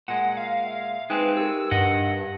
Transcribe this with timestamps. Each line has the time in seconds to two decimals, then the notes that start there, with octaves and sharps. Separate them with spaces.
0.08 A#2 G#3 F#5
0.37 F5
0.66 E5
1.10 G#3 C4 D#4 B4 G5 G#5
1.37 G4 A#4 E6
1.71 G2 D#5 F#5